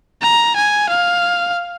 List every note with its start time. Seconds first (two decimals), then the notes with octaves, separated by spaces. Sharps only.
0.22 A#5
0.56 G#5
0.89 F5